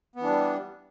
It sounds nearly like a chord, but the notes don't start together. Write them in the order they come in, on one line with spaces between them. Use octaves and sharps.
B3 E3 D4 G3